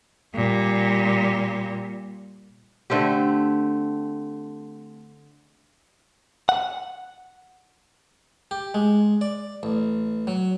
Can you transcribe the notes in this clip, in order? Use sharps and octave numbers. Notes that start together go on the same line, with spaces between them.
A#2 G3
D3 A3 C4 G4
F#5
G4
G#3
D5
A1
F#3